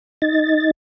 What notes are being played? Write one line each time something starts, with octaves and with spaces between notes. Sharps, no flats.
D#4 A6